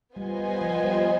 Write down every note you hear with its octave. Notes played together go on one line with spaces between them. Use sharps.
G3 B3 F4 C5 D#5 G#5
G3
F3
G3